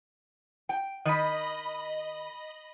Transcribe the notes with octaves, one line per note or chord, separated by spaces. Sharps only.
G5
D#3 D#5 B5